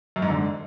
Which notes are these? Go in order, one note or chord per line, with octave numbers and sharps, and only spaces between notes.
F#2
G#2
D3